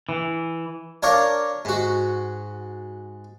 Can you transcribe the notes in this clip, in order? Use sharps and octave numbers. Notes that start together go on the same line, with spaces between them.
E3
D4 A#4 C#5 D5 F5
G#2 F#4